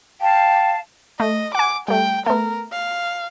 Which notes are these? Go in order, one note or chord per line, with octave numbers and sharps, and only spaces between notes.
F5 G5 A5
A3 D#5
F#5 G#5 D6
G3 A3 G5
A3 B3 A#4
F5